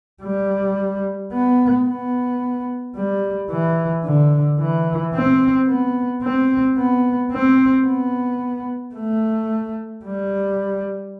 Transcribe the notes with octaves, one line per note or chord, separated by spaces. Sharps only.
G3
B3
B3
G3
E3
D3
E3
C4
B3
C4
B3
C4
B3
A3
G3